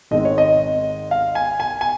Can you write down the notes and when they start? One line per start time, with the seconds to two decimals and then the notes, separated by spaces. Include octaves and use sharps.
0.11 G#1 G#2 D#3 G#3 C4 D#5
0.25 C#5
0.38 D#5
1.11 F5
1.35 G#5
1.60 G#5
1.81 G#5